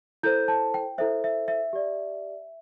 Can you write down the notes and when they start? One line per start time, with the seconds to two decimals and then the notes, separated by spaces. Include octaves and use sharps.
0.23 E4 A4 C5 G6
0.48 A5
0.74 G5
0.98 E4 A4 C5 E5
1.24 E5
1.48 E5
1.73 G4 D5